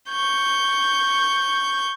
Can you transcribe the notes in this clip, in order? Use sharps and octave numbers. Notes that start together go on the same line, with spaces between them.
C#6 G6